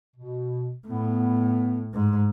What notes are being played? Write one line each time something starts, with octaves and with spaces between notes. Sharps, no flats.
B2
A2 B3
G#2